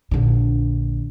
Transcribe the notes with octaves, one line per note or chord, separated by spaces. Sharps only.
A#1 D3